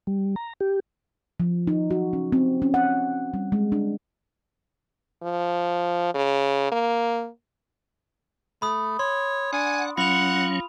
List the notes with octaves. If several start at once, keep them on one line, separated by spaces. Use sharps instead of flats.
G3
A#5
G4
F3
D#4
F#4
C#4
C4
C#4
F#5
G3
G#3
D4
F3
C#3
A#3
A3 B5 D#6
C#5 C6
D4 F#5 G#5
F#3 C#4 F4 F#5 B5 F7